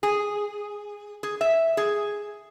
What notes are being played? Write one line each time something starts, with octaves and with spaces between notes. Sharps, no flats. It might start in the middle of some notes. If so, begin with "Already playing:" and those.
G#4
G#4
E5
G#4